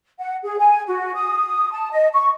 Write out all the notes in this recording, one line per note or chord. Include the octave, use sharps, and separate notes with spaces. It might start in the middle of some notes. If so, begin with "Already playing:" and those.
F#5
G#4
G#5
F#4
D#6
A5
D#5
C#6